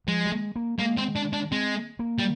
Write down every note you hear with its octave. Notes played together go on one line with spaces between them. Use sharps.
F3 G#3
G3
G#3
A#3
G#3 A#3
C4
D4
D4
G#3 C4
A#3
G3